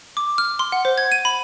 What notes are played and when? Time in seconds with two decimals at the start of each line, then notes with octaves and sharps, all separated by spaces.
0.17 D6
0.38 F6
0.59 C6
0.72 F#5
0.85 C5
0.98 G#6
1.12 D#7
1.25 B5